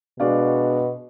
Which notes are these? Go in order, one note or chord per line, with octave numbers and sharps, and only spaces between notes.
B2 G#3 D4 F#4 D5 F5